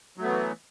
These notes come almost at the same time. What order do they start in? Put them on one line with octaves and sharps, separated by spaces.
F#3 A3 B3 E3